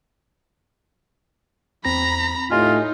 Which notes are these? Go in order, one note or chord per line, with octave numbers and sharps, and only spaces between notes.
E2 C4 A#5 B5 A#6
A2 D#4 F4 G4 D#5 G#5